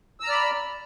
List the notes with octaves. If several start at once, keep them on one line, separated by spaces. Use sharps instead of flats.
D5 A#5 B5 E6 F6